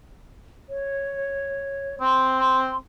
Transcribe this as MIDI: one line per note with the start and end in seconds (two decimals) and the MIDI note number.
0.69 1.96 73
2.01 2.74 60
2.01 2.76 84